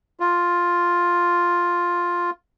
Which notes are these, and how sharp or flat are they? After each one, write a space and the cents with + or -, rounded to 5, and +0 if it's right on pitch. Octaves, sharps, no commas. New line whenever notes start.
F4 +5